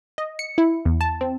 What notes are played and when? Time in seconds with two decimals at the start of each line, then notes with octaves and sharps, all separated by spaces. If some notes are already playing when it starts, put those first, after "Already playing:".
0.18 D#5
0.39 C#7
0.58 E4
0.85 E2
1.01 A5
1.21 C4